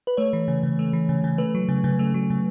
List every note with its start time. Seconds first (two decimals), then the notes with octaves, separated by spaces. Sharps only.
0.07 B4
0.17 A3 C#5
0.33 E3
0.48 C#3
0.63 C#3
0.79 A3
0.93 E3
1.09 C#3
1.24 C#3
1.38 A3 B4
1.55 F#3
1.69 C#3
1.84 C#3
1.99 A3
2.14 F#3
2.30 C#3